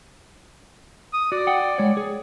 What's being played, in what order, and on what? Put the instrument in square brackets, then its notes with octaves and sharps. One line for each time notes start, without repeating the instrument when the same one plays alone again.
[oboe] D#6
[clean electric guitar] F#4 [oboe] D5
[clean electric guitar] F#5 G5
G#3 C#5
G#4